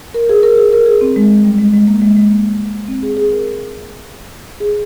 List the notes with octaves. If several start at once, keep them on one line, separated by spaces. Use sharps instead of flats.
A#4
G#4
A#4
G#4
A#4
G#4
C4
G#3
G#3
G3
G#3
G#3
A#3
G#3
G#3
A#3
C4
G#4
G#4
A#4
G#4